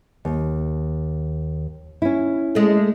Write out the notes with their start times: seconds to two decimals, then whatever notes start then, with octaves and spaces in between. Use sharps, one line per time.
0.25 D#2
2.02 C#4 E4
2.55 G#3 A3